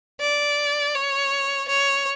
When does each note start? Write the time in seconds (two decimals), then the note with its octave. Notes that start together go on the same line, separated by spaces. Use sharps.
0.21 D5
0.95 C#5
1.69 C#5